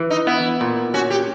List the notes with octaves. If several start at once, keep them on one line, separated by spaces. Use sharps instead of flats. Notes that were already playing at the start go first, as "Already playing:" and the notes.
Already playing: E3
D#4
B3 E4
A#2
C#4 F#4
G4